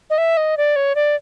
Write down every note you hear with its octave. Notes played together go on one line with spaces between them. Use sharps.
D#5
E5
D#5
D5
C#5
D5